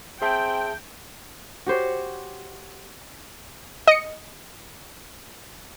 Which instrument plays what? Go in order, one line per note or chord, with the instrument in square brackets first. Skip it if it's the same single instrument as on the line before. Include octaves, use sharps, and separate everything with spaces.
[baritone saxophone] C4 [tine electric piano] G#4 E5 A5 [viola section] G5
[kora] F#4 G4 C5 C#5
[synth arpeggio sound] D#5 C#7